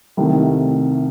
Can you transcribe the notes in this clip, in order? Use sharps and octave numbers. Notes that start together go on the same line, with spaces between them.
C2 C3 D#3 A3